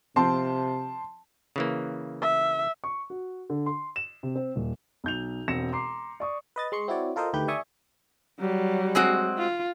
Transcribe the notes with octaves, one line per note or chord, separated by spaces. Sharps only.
C3 F3 C4 A5 C6
C#3 E3 A#3
E5
C#6
F#4
D3
C6
E7
C3
C4
D#1
B1 G6 F7
E1 C4 A#6 C#7 E7
A#5 C6 D6 C7
D5 C#6 D#6
B4 D#5 A6
G#3 D#5 C6 C#6 C#7
C4 E4 F#4 C#5 D5
F4 A4 A#4 C5 D#5
D2 D#3 A3 G4 B4 G6
D5 E5 G#5 C#6 D#6
F#3 G3
G#3 C4 F#4
F4